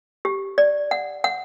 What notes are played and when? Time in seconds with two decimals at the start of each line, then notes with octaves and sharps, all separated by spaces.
0.25 G4
0.58 D5
0.91 F#5
1.24 F#5